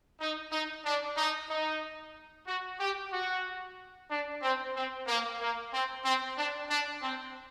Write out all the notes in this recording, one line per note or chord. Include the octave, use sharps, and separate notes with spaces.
D#4
D#4
D4
D#4
D#4
F#4
G4
F#4
D4
C4
C4
A#3
A#3
C4
C4
D4
D4
C4